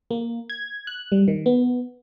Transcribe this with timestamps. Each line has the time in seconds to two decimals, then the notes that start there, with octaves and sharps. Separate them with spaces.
0.11 A#3
0.50 G#6
0.87 F#6
1.12 G3
1.28 D#3
1.46 B3